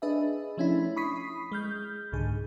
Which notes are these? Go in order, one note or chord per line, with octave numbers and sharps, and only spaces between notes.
D4 G#4 B4 D#5 E5
F3 A3 C#4 D4 E4
B5 C#6 D#6 B6 C7
G#3 F6 G6
C2 G#2 D3 G#4